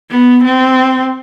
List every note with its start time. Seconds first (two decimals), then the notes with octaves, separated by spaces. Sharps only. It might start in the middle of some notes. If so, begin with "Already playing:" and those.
0.11 B3
0.44 C4